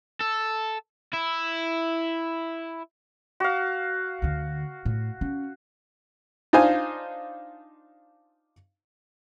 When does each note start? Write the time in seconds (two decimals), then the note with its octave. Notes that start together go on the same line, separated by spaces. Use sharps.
0.21 A4
1.13 E4
3.40 F#4 F5
4.22 D2 D3
4.85 A2
5.21 C#4
6.53 D4 D#4 F4 C5 G#5